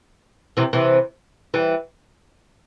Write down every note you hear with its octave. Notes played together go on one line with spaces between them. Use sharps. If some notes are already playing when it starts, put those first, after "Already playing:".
C3 E3
C3 E3
E3 G3